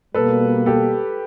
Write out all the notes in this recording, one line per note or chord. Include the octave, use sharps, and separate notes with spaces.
B2 G3 A#3 A4 B4
G4 A4